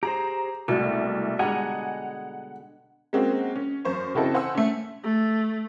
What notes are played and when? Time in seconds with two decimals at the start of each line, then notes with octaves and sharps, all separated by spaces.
0.03 G4 G#4 C5 A#5
0.68 C2 B2 G#3 A3
1.39 D3 G3 G#3 D#5 F#5 G#5 A#5
3.13 G#3 A#3 C4 C#4 F#4
3.56 C#4
3.85 F#2 C5 C#6
4.15 C#3 C4 E4 F#4 A4 D#5
4.34 C5 F#5 G#5 C6 E6
4.55 A3 C#4
5.03 A3